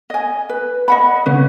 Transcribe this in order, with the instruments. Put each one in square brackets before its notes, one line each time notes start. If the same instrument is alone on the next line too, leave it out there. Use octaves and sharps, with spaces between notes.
[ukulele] D#5 G#5
B4
D#5 F#5 B5
[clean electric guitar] C#3 C#4 [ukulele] B4